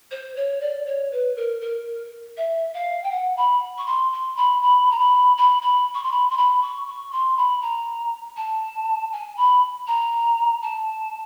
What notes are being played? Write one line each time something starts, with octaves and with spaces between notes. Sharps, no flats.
C5
C#5
D5
C#5
B4
A#4
A#4
E5
F5
G5
F#5
B5
C#6
C6
C6
B5
B5
A#5
B5
B5
B5
C#6
C6
B5
C6
B5
C#6
C#6
C6
B5
A#5
A5
G#5
B5
A#5
A5